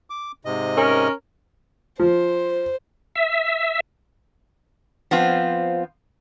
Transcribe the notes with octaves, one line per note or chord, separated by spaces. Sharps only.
D6
G#2 C3 D#5
C#4 A#4
F3 C5
E5
F3 B3 C4 F4